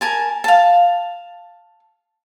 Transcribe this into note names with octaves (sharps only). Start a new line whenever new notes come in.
A#4 G#5 A5
F5 A5